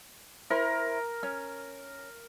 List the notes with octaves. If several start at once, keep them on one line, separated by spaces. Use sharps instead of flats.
E4 A#4 C5
C#4